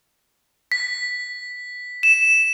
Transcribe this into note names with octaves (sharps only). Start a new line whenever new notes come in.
B6
E7